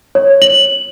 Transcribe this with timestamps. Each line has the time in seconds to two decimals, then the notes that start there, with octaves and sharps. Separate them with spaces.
0.15 C#5
0.42 F#7